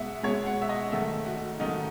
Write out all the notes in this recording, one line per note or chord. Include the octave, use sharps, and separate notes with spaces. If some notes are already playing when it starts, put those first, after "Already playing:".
Already playing: B2 G#3 E5 F#5
B2 G#3 C#5
F#5
E5
D#5
G#2 D#3 A3 E5
F#4
G#2 D#3 A3 D#4